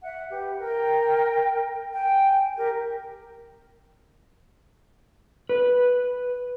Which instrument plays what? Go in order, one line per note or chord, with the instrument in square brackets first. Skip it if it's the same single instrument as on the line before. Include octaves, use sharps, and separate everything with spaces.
[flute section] E5 F#5
G4 B4
A#4 G5
G5 G#5
G4 A#4
[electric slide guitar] B4